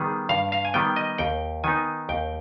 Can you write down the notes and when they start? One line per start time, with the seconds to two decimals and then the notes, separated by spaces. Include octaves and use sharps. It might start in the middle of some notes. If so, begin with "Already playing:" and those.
Already playing: D#3 G3 B3 G#4
0.29 G2 F5
0.52 F5
0.65 G#5
0.74 D#3 G3 B3 G5
0.96 D#5
1.18 D#2 G5
1.64 D#3 B3 D#4 G#5
2.09 D#2 G5